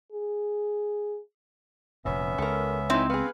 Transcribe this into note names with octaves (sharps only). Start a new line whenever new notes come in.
G#4
F1 A#2 B3 C#4 E5
C#2 A4 A#4
C4 D#4 E4
B3 G#4 B4 F5